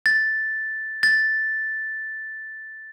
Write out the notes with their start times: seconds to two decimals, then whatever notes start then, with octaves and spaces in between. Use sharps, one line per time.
0.06 A6
1.03 A6